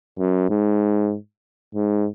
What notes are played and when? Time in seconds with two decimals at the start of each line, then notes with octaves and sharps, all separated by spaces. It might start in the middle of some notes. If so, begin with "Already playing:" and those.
0.19 F#2
0.50 G#2
1.75 G#2